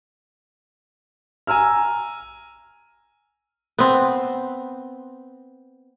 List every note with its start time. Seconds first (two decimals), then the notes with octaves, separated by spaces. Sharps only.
1.47 G#5 A#5 E6 F6
3.79 B3 C4